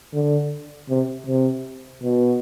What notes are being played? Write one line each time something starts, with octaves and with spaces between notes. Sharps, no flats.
D3
C3
C3
B2